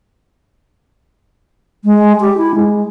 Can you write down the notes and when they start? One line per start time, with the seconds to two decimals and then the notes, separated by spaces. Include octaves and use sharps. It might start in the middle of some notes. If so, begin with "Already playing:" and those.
1.84 G#3
2.20 G4
2.37 E4
2.55 G#3